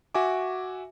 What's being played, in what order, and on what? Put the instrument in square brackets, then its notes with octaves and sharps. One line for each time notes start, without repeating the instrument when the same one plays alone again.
[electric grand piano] F#4 E5 G#5 D6